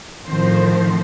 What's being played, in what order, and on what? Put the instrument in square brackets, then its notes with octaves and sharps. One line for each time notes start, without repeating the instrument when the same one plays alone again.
[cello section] A2 D#3 F3 C4 C5